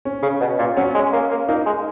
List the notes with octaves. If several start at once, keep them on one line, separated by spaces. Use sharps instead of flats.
C#4
C#3
B2
A#2
F#3 C#4
G#3
A#3
A#3
A#3 D#4
G#3